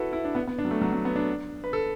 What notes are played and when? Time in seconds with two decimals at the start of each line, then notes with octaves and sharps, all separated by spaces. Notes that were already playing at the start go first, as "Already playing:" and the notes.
Already playing: E4 F#4 A4 B4
0.13 E4
0.25 D4
0.35 B3
0.47 B3
0.58 D4
0.65 F#3
0.71 A3
0.81 F#3
0.92 F#3
1.05 B3
1.16 D4
1.64 B4
1.73 A4